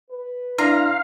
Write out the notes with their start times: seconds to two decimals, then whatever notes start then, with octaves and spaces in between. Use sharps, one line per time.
0.10 B4
0.58 D4 E4 F5 A#5 C6